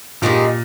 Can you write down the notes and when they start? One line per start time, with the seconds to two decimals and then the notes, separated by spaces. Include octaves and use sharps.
0.22 A#2 D#3 G#3 D#4 G4